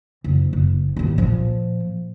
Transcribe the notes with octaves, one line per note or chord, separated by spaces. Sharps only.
F#1
F#1
D#2 A2
A#2 F3